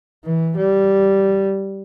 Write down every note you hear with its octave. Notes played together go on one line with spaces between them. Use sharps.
E3
G3